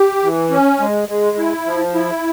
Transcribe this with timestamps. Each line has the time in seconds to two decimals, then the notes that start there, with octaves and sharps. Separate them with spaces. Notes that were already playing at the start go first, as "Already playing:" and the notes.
Already playing: G4
0.22 E3
0.50 C#4
0.80 G#3
1.09 G#3
1.37 E4
1.66 F3
1.95 E4